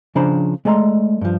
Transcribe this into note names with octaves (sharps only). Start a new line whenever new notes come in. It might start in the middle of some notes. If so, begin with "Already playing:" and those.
C#3 F3 D4 C5 A#5 B5
G#3 A3 D5 G#5 A#5 C6
G2 F3